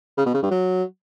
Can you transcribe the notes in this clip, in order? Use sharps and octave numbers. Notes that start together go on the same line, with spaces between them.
C#3
B2
C#3
G2
F#3